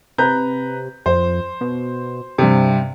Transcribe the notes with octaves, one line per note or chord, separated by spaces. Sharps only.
C3 B4 A#5 G6
F2 C5
B2
G2 C3 C4